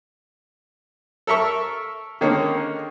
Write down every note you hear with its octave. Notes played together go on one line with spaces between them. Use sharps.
A4 A#4 E5 C#6
D3 D#3 G#3 A#3 C#4